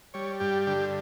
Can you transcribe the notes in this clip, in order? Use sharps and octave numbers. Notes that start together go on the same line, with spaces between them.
G3 C#5
G2 G4
D3 G4